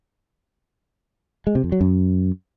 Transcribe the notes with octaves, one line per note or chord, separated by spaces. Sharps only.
G#3
C3
F2
F#3
F#2